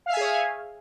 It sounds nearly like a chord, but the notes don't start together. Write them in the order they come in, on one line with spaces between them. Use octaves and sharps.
F5 E5 G#5 G#4 C#5